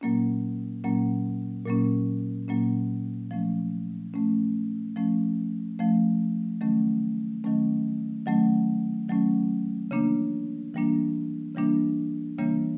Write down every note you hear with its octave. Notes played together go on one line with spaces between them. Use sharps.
A#2 F#3 A#3 C#4
A#2 F#3 A#3 C#4
A#2 F#3 A#3 C#4
A#2 F#3 A#3 C#4
F3 A3 C#4
F3 A3 C#4
F3 A3 C#4
F3 A3 C#4
D#3 F#3 A3 C#4
D#3 F#3 A3 C#4
D#3 F#3 A3 C#4
D#3 F#3 A3 C#4
C#3 E3 G3 A#3 D4
C#3 E3 G3 A#3 D4
C#3 E3 G3 A#3 D4
C#3 E3 G3 A#3 D4